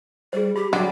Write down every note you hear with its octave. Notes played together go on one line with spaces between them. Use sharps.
G3 G#4 C5
G4 B5
D3 F#3 G3 F#4 D5